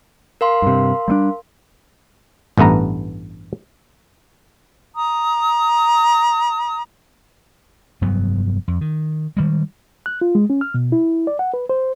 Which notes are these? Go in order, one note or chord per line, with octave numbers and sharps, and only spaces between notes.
A#4 F5 C6
G2 C3
G3 A3 D4
A1 G2 A3 B3 A#5
A#5 D#6
F1 G2 F#3 B3
F2
D#3
D#3 G3 G#3
F#6
F4
G#3
C#4
F6
B2
E4
D5
F#5
B4
C5